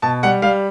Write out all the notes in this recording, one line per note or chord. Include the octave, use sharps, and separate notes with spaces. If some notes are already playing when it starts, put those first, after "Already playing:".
B2 A5
G3 F#5
G3 F5